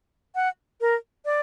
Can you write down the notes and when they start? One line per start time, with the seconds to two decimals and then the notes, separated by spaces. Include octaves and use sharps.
0.35 F#5
0.81 A#4
1.25 D5